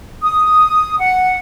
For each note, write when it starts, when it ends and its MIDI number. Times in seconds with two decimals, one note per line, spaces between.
0.22 0.98 87
0.99 1.37 78